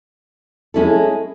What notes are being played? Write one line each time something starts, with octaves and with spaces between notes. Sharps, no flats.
G#3 C#4 E4 A4